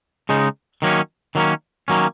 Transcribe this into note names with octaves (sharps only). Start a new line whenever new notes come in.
C#3 G#3 D#4
D#3 F#3 A#3 C#4
D#3 F#3 A#3 C#4
D#3 F#3 A#3 C#4